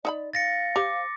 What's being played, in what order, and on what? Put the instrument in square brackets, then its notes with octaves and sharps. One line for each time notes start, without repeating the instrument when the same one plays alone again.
[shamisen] D#4 E5 B5 [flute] D5
[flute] F5 [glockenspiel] A6 A#6 C#7
[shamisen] G4 C5 [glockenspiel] D6